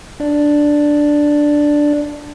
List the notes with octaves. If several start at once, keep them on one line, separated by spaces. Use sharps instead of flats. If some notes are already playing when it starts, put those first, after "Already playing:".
D4 D5